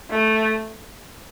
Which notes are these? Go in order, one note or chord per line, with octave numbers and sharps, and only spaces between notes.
A3